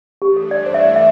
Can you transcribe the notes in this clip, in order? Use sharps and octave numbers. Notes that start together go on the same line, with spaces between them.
G2 E3 A3 D4 G4
A4
D5
C5
E5
D5
E5